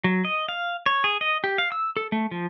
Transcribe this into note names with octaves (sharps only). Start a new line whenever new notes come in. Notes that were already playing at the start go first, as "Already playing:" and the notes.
F#3
D#5
F5
C#5
G#4
D#5
G4
F5
E6
A4
A3
F3